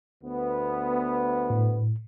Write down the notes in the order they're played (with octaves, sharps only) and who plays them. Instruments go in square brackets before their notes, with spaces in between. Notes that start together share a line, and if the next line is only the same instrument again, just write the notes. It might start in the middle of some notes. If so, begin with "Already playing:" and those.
[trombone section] D2 B3
[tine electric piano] A2